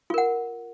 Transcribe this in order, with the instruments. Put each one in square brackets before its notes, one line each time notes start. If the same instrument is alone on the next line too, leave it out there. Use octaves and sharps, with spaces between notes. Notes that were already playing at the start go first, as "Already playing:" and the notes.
[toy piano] F4
A#4
F#5